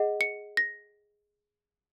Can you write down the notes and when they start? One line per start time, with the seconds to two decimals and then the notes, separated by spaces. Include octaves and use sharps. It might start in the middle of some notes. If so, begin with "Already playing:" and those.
Already playing: G#4 D#5 F#5
0.21 C#7
0.57 A#6